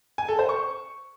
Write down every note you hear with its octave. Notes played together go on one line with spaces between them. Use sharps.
G#5
A4
C5
C#6